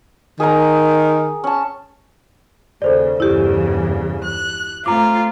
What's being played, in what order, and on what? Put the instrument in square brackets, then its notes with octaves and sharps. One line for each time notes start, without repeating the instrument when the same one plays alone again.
[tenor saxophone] D#3 [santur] G#4 A#5
[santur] C#4 A5
[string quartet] D#2 C#3 [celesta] A4 C5 D5
[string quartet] E2 G2 C#3 [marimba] E4 G4
[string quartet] F#6
[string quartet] A3 C4 F4 [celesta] A#5 D6